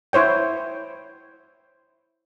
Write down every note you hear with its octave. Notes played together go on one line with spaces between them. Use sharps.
E4 C5 C#5 G5